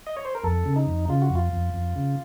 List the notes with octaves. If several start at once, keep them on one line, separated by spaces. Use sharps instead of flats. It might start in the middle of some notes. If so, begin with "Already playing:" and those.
D#5
C#5
C5
A#4
F2 A4
C#3
D#4
F2
C#3 F4
F#4
F2
F4
F2
F2
C#3